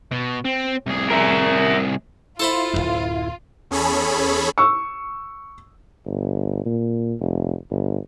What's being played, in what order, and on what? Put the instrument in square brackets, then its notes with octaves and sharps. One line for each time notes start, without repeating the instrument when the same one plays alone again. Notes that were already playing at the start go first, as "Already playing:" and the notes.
[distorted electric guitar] B2
C4
C2 G#4
[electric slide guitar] A#4 E5
[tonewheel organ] E4 [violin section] F4 [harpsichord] A4 C5 B5
[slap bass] D1 G#1 F#2
[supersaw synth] E2 C#4 G#4 A4 C#5 B5
[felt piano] C#6 E6
[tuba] G1
A#2
F1
G1